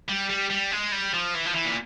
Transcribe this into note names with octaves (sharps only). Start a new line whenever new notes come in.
G3
G3
G3
G#3
G3
F3
E3
F3
E3
A#2